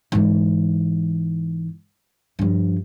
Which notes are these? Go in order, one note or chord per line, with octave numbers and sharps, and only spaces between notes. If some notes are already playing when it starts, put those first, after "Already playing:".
G#2 E3
G2 F3